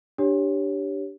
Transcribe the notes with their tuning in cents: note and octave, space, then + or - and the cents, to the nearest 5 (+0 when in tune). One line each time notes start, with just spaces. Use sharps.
D4 +0 G4 +0 C#5 +0